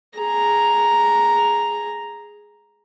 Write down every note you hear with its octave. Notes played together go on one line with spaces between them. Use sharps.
G#4 A#5